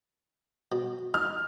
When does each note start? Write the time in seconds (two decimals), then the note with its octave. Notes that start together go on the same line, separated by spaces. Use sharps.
0.72 B2
1.14 D#4 F6